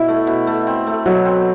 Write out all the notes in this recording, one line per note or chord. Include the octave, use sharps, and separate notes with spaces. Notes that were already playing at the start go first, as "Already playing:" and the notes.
Already playing: B2 E4
A3
B2
A3
C4
A3
B2 F#3
C4